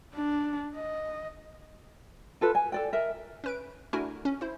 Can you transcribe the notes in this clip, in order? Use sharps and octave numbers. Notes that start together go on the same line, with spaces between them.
D4
D#5
F4 A4 B4
G#5
A4 D5 G5
A#4 D#5 E5
C#4 B4 D7
A3 D4 E4 F#4 A#4 G#5
C#4
E4 C5